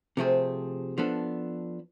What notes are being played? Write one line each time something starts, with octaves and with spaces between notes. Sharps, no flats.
C3 F3 A3 C4 G#4
F3 B3 D4 A4